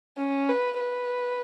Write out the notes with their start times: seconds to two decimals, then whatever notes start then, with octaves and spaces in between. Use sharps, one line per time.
0.17 C#4
0.49 B4
0.80 B4